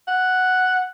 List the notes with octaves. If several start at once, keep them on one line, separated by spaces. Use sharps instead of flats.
F#5